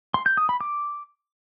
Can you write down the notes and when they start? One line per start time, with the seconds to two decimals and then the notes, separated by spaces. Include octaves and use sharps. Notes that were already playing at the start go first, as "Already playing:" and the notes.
0.14 C6
0.26 G6
0.37 D#6
0.49 B5
0.61 D6